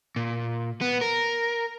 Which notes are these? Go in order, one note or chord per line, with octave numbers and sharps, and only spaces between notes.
A#2
B3
A#4